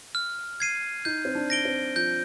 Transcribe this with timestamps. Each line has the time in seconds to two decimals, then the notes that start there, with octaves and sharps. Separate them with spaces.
0.15 F6
0.60 G#6 C7 D#7
1.05 D#4 G6
1.25 C4
1.35 D4
1.50 A#6 D7 G7
1.65 C4
1.96 F3 G6